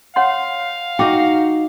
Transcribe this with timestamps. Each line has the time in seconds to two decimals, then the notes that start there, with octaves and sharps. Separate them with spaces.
0.16 C#5 F5 F#5 C6
0.99 D#4 F#4 G5 D6